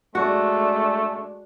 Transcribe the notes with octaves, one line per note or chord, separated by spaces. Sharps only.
G#3 A3 D4 F#4